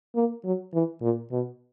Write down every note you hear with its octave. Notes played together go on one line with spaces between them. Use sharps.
A#3
F#3
E3
A#2
B2